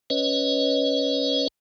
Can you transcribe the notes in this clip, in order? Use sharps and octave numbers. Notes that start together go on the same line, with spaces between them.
C#4 B4 C#5 D#5